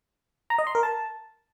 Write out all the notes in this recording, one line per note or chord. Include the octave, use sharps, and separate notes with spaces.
A#5
D#5
C6
A#4
A5